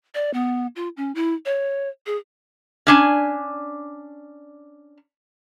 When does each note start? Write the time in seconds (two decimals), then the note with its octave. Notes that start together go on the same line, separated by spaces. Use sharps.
0.15 D5
0.34 B3
0.76 F4
0.97 C#4
1.15 E4
1.46 C#5
2.06 G#4
2.87 C#4 D4 G#5